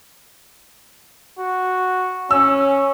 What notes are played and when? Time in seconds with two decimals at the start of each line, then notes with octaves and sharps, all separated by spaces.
1.38 F#4
2.31 C#4 E6